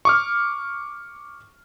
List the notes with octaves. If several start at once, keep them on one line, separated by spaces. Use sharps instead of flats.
C#6 D6 F6